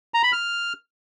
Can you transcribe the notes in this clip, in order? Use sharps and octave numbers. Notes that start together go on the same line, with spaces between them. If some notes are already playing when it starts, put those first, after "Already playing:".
A#5
B5
F6